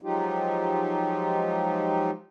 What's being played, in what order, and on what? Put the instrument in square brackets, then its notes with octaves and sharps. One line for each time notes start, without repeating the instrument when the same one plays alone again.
[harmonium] F3 F#3 G#3 D#4 F4 G4